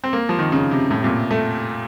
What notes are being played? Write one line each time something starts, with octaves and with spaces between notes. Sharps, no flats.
C4
A#3
F3
D#3
C#3
C3
A2
C3
A#2
A3